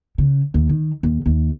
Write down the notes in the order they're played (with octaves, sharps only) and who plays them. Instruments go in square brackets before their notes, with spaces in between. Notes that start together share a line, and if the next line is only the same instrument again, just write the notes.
[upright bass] C#3
D#2
D#3
D#2
D#2